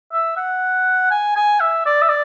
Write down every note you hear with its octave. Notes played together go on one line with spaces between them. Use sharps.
E5
F#5
G#5
G#5
E5
D5
E5
D5